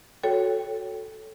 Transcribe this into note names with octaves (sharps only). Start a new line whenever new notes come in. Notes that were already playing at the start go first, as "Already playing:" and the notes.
F#4 A4 C#5 G5